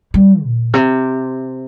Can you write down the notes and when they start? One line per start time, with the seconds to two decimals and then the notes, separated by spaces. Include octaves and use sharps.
0.14 G3
0.44 A#2
0.74 C3